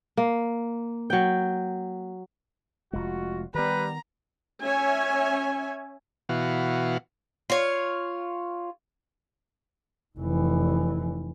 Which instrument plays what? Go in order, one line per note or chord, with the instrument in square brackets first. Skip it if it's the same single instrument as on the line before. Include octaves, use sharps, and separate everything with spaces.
[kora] A#3
F#3 G5
[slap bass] F1 G#3 [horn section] F4 F#4
[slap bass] D#3 B3 [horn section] G3 [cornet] B4 [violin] A#5
[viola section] C#4 C#5 E5 G#5
[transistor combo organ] B2 E3 F#4 F5
[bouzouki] F4 C#5
[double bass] F1 E3